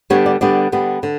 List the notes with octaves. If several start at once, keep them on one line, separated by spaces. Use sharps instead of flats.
D3 G3 B3 D4 C#5
D5
D3 G3 B3 D4 D5
D3 G3 B3
D3